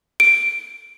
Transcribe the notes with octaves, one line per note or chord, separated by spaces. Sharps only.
D7